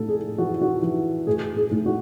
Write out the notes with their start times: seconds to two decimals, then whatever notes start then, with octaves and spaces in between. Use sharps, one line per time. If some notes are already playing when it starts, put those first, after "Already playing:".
Already playing: A2 A4
0.09 G#4
0.38 E3 F#4
0.61 F#4
0.82 E3
1.27 A2 G#4
1.57 G#4
1.71 A2
1.86 F#4